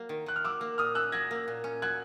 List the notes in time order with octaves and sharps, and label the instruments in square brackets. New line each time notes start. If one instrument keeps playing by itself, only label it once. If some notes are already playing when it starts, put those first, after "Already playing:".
Already playing: [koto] F#3 A#3
D#3
[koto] D#3 [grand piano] F#6
[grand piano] F6
[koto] F#3 [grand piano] D6 E6
[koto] A#3
[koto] A#2 [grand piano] D#6 F6
[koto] C#4 [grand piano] E6 F#6
[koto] F#3 [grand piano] G#6 A#6
[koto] A#3
A#2
C#4
[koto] F#3 [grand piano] F#6 G#6